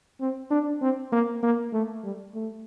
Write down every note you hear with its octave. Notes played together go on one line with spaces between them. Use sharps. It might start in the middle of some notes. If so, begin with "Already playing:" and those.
C4
D4
C4
A#3
A#3
A3
G3
A3